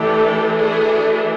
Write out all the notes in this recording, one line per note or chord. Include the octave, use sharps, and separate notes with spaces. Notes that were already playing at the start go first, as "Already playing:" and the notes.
Already playing: E3 A3 D4 G4 A4
F#4 G#4